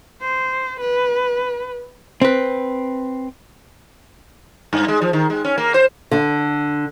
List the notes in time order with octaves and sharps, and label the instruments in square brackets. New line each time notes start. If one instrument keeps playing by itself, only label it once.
[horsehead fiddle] C5
B4
[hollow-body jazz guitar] C4 B4
[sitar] G2
G#3
F3
D#3
G#3
C#4
A#3
C5
[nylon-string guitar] D3